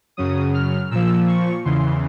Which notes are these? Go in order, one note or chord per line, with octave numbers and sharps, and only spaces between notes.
F#2 C#3 F#3 D#6
F6
A#2 F3 E6
C#6
E2 C#3 E3 C6